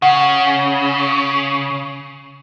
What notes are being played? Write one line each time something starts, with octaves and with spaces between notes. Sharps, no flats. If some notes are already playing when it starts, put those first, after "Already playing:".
C#3 F#5